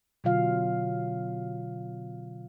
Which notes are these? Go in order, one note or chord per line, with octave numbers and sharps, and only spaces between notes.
B2 D3 F#3 F4 F5